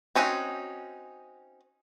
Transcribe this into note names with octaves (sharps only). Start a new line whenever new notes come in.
C4 C#4 D#4 E4 F#4